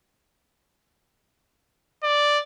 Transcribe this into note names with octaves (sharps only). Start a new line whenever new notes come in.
D5